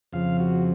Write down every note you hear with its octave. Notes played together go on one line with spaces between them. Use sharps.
F2 C#3 F3 F5
F#4